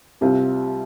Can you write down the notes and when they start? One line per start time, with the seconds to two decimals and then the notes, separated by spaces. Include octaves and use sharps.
0.21 C2 C3 G3 C4 F4